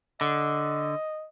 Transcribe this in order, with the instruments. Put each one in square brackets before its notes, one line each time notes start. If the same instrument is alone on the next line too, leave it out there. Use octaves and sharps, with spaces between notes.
[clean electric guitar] D3 [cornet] D#5